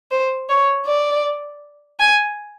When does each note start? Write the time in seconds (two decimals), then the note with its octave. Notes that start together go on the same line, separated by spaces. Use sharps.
0.11 C5
0.49 C#5
0.86 D5
1.99 G#5